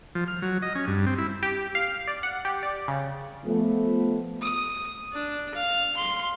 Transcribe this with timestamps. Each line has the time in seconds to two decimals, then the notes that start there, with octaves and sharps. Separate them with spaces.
0.15 F3
0.28 F6
0.42 F#3
0.62 D#5
0.75 C#4
0.87 G2
1.06 C4
1.18 E4
1.43 G4
1.75 F5
2.07 D5
2.23 F#5
2.45 G4
2.63 D5
2.88 C#3
3.45 F3 A3 B3
4.42 D#6
5.13 D4
5.55 F5
5.97 C6